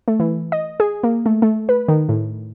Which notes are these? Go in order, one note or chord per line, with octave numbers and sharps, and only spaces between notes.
A3
E3
D#5
G#4
A#3
A3
A3
B4
D#3
A2